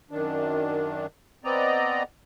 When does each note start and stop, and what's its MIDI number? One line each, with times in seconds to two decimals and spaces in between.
0.11 1.06 42
0.11 1.06 51
0.11 1.06 62
1.44 2.03 59
1.44 2.03 60
1.44 2.03 74
1.44 2.03 75
1.44 2.03 82